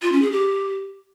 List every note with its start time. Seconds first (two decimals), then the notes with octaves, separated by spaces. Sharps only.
0.02 F4
0.12 C#4
0.22 G#4
0.32 G4